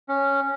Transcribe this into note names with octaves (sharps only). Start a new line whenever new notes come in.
C#4